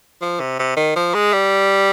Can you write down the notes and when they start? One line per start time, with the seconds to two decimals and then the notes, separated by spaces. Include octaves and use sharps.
0.22 F3
0.40 C3
0.59 C3
0.77 D#3
0.96 F3
1.15 G#3
1.33 G3